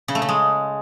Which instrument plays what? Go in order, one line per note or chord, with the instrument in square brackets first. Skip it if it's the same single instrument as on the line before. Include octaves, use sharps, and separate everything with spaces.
[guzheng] C#3
A3
C#3
G#3